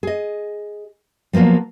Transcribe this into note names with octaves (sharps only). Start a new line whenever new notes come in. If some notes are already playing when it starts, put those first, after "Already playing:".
G#4 D#5
F3 F#3 A#3 B3 F4